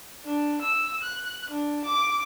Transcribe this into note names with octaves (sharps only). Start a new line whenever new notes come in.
D4
E6
F#6
D4
D6